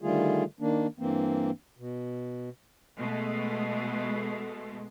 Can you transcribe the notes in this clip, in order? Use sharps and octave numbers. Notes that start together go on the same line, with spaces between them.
D3 D#3 G3 A3 F4 G#4
D#3 A#3 D4
G2 E3 A#3 C4
B2
B2 G#3 A3